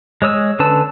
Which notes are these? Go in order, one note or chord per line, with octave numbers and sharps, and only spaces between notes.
G#3 C#5 D#6 E6
D3 C#4 B4 A5 E6